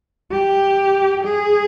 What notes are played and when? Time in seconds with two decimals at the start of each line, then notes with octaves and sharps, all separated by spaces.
0.31 G4
1.24 G#4